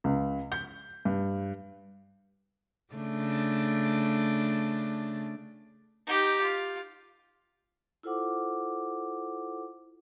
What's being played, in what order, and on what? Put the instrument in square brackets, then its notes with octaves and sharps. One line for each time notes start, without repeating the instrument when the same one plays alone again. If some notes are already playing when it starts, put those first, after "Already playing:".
[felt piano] C#2
G6
G2
[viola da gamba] C#3 A3 D4
[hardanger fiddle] D#4 G4
F4
[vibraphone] E4 F4 A4 C5 F#5 D6